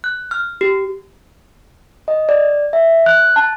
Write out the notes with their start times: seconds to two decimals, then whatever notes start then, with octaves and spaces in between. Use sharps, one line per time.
0.04 F#6
0.31 F6
0.61 G4
2.08 D#5
2.29 D5
2.73 E5
3.06 F#6
3.36 A5